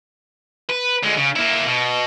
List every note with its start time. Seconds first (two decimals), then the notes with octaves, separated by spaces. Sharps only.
0.70 B4
1.03 D3 G#3
1.18 C#3
1.36 A#3 E4
1.66 B2